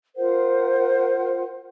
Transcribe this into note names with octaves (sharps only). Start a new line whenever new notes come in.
F4 A#4 C5 F#5